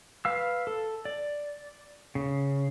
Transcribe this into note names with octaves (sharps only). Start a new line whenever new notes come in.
B4 F5 E6
A4
D5
C#3